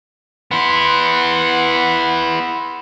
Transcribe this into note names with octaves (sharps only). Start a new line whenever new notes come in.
B3 E4 F#5 C6